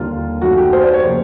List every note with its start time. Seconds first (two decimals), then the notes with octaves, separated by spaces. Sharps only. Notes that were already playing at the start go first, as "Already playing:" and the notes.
Already playing: D#2 D3 G3 A#3 F4
0.42 F#2 D#3 F#3 A3 F#4
0.57 G4
0.73 C5
0.83 D5
0.93 C#5
1.04 C#3 F3 A#3